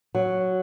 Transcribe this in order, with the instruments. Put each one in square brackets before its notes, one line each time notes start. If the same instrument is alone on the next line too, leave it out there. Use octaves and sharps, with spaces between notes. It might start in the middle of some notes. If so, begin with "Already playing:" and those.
[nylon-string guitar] F#3